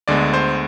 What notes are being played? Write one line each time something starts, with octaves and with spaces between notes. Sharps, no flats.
D2 D3 G#3 B3 D5
C5